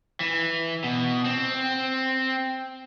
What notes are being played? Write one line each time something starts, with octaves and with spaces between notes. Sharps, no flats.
E3
B2
C4